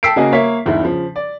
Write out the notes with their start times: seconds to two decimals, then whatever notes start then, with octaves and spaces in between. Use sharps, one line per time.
0.03 G5 A5 E6 B6 C7 D7
0.16 C#3 A#3 F#4 D#5 G#5
0.32 A#3 C#5 E5 B6
0.66 G1 E2 G#2 E4
0.82 C#3 F3
1.16 D5